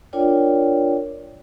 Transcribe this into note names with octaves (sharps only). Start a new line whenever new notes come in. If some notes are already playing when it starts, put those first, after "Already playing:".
D4 F4 A#4 C#5 D5 G5